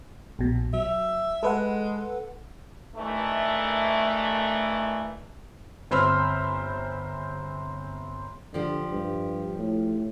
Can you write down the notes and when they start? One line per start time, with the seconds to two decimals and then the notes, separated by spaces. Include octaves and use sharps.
0.39 A#1 B2
0.73 F#3 E5
1.43 G#3 A4 B4 F#5
2.95 G2 D#3 E3 A3
5.91 G1 C4 C5 B5 E6 F6
8.54 D3 F3 G4
8.92 G2
9.57 A2